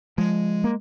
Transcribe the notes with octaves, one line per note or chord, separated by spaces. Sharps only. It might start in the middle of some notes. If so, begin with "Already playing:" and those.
F3 G#3
A#3